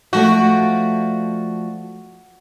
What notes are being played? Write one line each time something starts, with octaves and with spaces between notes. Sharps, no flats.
F3 A3 F#4 D5